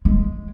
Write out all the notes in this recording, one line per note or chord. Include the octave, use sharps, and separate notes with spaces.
G#3